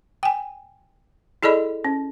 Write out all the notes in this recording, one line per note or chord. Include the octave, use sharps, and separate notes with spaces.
G5 G#5
E4 G#4 A4 D5 D#5 B5
C#4